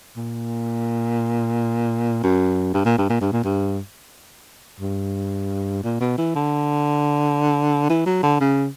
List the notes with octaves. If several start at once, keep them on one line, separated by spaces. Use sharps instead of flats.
A#2
F#2
G2
A#2
G2
A#2
G2
A#2
G2
G2
A#2
B2
E3
D3
E3
F#3
D3
C#3